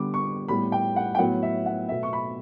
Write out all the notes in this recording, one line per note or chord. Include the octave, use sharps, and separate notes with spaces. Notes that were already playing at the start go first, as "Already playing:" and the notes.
Already playing: D3 G3 B3 D6
C#6
A2 G3 B3 B5
G5
F#5
G5
A2 F#3 B3 F#5
E5
F#5
B2 A3 E5
C#6
B5